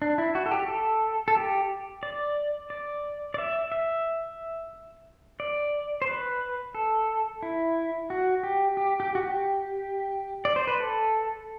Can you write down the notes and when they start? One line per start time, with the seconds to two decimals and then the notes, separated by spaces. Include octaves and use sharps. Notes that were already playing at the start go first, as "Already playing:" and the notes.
0.02 D4
0.18 E4
0.35 F#4
0.46 A4
0.51 G4
0.68 A4
1.28 A4
1.36 G4
2.03 D5
2.70 D5
3.34 D5
3.38 E5
3.72 E5
5.40 D5
6.02 C5
6.07 B4
6.75 A4
7.43 E4
8.10 F#4
8.43 G4
8.77 G4
9.00 G4
9.15 F#4
9.23 G4
10.45 D5
10.56 C5
10.67 B4
10.80 A4